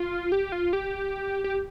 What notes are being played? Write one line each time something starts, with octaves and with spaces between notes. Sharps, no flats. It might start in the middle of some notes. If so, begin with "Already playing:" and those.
Already playing: F4
G4
F4
G4
G4